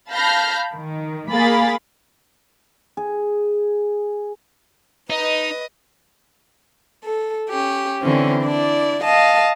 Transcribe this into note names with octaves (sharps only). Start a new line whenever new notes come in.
F5 A5 B5 F6 G6 A#6
D#3
A#3 G#4 A#4 F5 B5 A6
G#4
D#4 B4 D#5
A4
C#4 G4
D3 E3 C4 C#4
D4 E4 D5
D#5 F5 A5